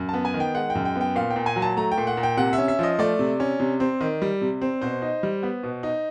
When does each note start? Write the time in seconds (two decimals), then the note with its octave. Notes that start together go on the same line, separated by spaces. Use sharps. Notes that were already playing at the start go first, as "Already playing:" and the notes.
Already playing: F#2
0.09 B3 A5
0.25 G#5
0.34 D#3
0.40 G5
0.54 G#3 F#5
0.70 G5
0.75 F#2
0.85 G5
0.96 B3
1.01 G5
1.16 A#2 F5
1.30 G5
1.36 A#2
1.46 G#5
1.56 F#3
1.62 A5
1.77 A3 A#5
1.92 G5
1.97 A#2
2.07 F#5
2.17 A#2
2.23 G5
2.37 C3 F#5
2.53 E5
2.58 C#4
2.68 E5
2.79 F3 D#5
2.99 A3 D5
3.19 C3
3.40 C#4
3.60 C3
3.80 C4
4.01 D#3
4.22 G3
4.41 C3
4.62 C4
4.81 B2 C5
5.02 D#4
5.23 G3
5.43 B3
5.63 B2
5.83 D#4